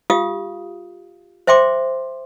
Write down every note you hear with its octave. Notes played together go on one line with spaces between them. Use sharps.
F4 G4 F5 D#6
C5 E5 G5 C6 D6